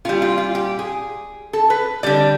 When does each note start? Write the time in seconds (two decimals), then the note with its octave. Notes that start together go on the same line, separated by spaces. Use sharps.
0.05 A#2 G3 F4
0.22 F4
0.38 F4
0.55 G4
0.79 G#4
1.53 A4
1.70 B4
2.03 D3 G3 D5